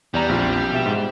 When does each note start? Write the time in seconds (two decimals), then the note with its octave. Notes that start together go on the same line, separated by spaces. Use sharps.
0.14 E2 G3 D5 A#5
0.29 A#1 C4 F4
0.72 B2 E5 E7
0.86 G#2